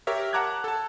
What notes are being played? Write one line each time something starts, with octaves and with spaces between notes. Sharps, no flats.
G4 A#4 C#5 E5
F#5 A5 A#5 D6 F#6 G#6
A4 A5